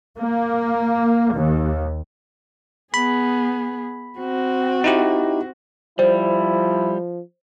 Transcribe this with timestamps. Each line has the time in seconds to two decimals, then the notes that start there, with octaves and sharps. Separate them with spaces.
0.19 A#3
1.35 D#2
2.94 B3 G#4 B5
4.19 C4 F#4
4.84 D#4 E4 G4
5.99 F3 G3 E4 C5